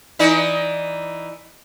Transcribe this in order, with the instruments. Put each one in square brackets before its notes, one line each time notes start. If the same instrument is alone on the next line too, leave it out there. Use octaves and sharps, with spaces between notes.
[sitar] E3 D#4 D5